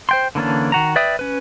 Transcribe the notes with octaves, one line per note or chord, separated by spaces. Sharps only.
C5 G5 C6
D3 E3 A#3 C#4 D4
D#3 F#4 A#5
B4 D5 E5 G5 D#6
C#4 B4